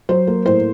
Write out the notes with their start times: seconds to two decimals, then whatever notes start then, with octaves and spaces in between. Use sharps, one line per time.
0.09 F#3 C5
0.27 A#3
0.46 A2 C5